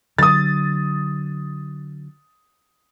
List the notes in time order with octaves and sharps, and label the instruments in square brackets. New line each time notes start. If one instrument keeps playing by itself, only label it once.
[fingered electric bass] D3 F#3 [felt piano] D#6 A6